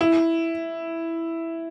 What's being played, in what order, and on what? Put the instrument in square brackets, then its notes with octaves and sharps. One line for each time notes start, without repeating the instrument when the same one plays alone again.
[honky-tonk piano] E4